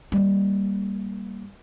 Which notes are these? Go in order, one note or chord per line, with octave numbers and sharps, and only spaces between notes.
G3 A#3